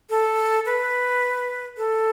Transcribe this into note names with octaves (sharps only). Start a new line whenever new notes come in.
A4
B4
A4